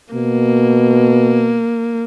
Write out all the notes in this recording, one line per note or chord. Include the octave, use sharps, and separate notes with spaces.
B2 A#3